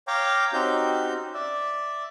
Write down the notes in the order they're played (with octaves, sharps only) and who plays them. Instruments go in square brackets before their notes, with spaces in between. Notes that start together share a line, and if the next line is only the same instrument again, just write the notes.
[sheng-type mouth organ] C#5 F5 G5 A#5 D6
C4 C#4 D#4 F#4 G4 G6
D5 E5